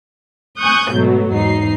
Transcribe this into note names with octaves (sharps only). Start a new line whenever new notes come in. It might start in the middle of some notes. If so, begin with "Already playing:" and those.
G#5 C#6 D#6 F#6 G6
G#2 B2 F#3 A3
E2 G#2 D#4 C7